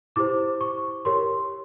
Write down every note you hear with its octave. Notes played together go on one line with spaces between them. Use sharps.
E4 G4 C5 D6
C#6
G4 A#4 C#5 C6